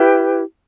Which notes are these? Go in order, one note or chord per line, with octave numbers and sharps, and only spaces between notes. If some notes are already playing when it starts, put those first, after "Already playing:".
Already playing: E4 G4 B4